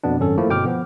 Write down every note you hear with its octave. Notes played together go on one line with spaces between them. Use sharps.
F2 B2 B3 D4
G#1 F#2 C#4 A4
F3 A3 A#3 E4
G1 B2 G5 D6 F6
F3 B3